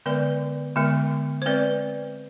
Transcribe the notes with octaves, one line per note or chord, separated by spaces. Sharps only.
D3 G#3 B3 B4 D5
D3 G#3 B3
C5
G#3 C4 B4 D5